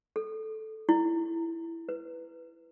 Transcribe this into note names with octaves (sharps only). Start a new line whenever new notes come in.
A4
E4
B4